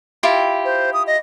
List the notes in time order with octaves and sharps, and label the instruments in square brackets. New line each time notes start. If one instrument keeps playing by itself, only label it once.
[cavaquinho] E4 F4 G4
[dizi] C5
D#6
D#5